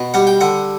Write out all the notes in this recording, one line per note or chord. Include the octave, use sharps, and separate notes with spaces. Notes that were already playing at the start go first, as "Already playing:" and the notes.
Already playing: B2
G3 F#5
G5
D3 F#5